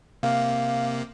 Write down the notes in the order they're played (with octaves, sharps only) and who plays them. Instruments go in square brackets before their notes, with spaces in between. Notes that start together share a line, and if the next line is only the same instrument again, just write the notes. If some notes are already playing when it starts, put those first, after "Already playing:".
[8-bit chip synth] C3 A#3 [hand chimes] F5